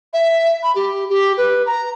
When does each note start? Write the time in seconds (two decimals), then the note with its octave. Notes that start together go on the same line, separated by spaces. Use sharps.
0.13 E5
0.63 B5
0.75 G4
1.09 G4
1.37 B4
1.66 A#5